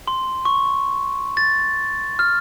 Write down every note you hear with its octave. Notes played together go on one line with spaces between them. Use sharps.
C6
C#6
A6
F6